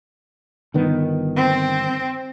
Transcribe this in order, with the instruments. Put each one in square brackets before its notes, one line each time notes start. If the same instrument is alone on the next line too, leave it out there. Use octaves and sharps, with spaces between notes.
[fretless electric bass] G1 D#3 B3
[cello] C4